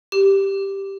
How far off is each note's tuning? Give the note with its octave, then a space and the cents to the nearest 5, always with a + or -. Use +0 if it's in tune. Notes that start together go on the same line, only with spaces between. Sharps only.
G4 +0